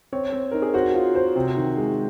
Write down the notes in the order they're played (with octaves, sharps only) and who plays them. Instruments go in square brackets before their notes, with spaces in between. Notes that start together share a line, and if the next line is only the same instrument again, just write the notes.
[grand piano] C4 [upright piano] C#5
[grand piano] C4
[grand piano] D#4 [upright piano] A#4
[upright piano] G#4
[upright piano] F#4 [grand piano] C5
[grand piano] F4
C5
C3
D#3
G#3